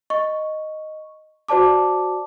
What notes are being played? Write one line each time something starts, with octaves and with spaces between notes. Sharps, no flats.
D#5 C#6
F#4 C5 D5 A5 D6